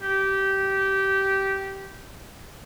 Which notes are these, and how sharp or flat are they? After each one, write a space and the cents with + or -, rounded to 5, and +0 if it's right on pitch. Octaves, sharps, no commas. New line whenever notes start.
G4 -15